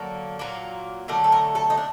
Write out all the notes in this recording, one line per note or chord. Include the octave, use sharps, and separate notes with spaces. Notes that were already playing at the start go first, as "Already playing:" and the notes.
Already playing: D3 F#3 A#3
A#2 F#3 A#3
D3 F#3 A3 A#4
A4
A#4
A4
D#4
D4